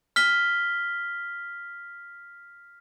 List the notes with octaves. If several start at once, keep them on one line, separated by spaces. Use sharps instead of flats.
F6 B6 G7